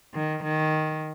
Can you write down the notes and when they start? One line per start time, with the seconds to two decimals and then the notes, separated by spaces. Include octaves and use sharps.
0.14 D#3
0.44 D#3